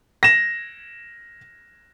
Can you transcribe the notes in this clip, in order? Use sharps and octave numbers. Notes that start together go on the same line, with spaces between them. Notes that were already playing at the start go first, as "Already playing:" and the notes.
A#6 E7